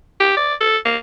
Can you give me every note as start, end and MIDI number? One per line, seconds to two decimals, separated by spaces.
0.20 0.34 67
0.37 0.54 74
0.61 0.77 69
0.85 0.97 58